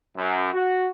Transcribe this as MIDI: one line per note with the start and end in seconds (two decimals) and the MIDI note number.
0.16 0.49 42
0.52 0.87 66